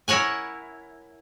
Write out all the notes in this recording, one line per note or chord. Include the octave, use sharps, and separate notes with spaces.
E4 A#4 C#5 F#5 G#5